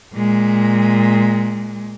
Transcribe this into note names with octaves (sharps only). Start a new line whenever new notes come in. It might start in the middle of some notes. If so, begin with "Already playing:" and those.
A#2 G#3